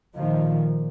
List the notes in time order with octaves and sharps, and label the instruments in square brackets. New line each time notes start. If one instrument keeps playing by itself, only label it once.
[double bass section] A#2 D#3 F3